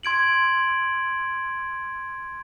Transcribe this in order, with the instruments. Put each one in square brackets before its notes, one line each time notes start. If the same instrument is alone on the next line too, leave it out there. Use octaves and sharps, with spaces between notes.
[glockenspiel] C6 G#6 D7 F#7